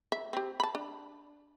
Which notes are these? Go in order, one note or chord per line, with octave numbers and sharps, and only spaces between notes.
E5
C4 G4
A5 B5
D4